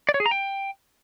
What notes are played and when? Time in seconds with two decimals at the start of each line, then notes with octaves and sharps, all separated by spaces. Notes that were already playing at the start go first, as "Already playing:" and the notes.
0.09 D5
0.14 C#5
0.20 G#4
0.26 A#5
0.31 G5